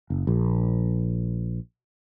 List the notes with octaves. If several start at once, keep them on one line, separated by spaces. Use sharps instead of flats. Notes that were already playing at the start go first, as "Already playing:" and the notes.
F#1
A#1